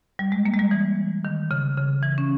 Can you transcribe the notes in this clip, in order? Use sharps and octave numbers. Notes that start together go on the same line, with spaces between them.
G3
G#3
A#3
G#3
G3
E3
D#3
C#3
C#3
E3
C#4